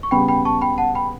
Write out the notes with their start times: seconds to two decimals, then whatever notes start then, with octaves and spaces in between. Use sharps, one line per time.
0.03 C#6
0.11 C#3 G3 B3 G5 B5
0.28 G5 B5
0.45 A5 C#6
0.61 G5 B5
0.78 F#5 A5
0.95 G5 B5